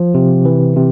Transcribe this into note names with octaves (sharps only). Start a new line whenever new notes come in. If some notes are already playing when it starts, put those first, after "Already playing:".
Already playing: F3
C3
E3
C3